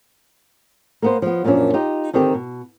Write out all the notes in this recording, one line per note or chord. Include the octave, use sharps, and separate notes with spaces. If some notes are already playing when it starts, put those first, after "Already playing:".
A#3 B3 C5
F3 B3
F#2 A#2 F3 G#3 C#4 D4
D#4 F4 G4
D3 D#3 C4 D#4 G4
B2